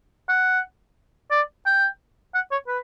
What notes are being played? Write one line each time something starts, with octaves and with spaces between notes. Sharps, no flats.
F#5
D5
G5
F#5
C#5
B4